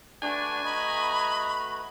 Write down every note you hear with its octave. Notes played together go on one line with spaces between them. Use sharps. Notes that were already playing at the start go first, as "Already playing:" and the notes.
A3 D4 F#4 B4 G#5
D#5 A#5 B5